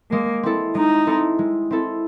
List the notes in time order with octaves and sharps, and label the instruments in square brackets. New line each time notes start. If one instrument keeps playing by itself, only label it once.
[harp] G#3 [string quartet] A#3
[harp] C4 E4 A4
[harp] G#3 [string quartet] D#4
[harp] C4 E4 A4
G#3
C4 E4 A4